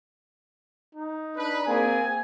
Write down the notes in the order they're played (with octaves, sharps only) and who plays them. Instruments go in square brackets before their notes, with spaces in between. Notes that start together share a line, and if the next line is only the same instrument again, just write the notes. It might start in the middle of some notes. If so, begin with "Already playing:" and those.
[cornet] D#4
[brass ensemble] D4 B4
[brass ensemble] A#3 C4 G#4 [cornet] G#5